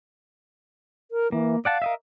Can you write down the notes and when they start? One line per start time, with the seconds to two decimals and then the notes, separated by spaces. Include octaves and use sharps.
1.11 A#4
1.32 E3 A#3
1.65 D5 F5 F#5 A5
1.82 A#4 D#5 E5